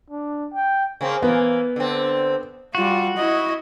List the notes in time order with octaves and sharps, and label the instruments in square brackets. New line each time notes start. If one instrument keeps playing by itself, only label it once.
[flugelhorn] D4
G5
[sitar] C#3 A#3 C4
[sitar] E3 A#3 [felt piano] B3
[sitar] D3 C4
[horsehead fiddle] G3 F4 [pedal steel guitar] F#4
[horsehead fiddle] E4 D#5